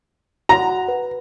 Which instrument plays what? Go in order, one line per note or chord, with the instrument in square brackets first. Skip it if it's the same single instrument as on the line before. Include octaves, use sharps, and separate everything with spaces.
[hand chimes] F#4 F#5 [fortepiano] A#5
[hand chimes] B4